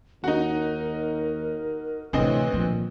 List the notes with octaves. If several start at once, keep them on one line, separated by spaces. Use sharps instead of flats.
D#2 D#4 F#4 A#4
D2 A2 C3 E3 C4 B4 D#5
A#2 D#3 F3